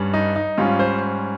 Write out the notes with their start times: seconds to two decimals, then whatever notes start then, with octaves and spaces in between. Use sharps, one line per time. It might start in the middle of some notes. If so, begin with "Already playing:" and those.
Already playing: G2 G3 C#4
0.14 D#4
0.36 D#4
0.57 G#2 G3 C#4 F4
0.79 C5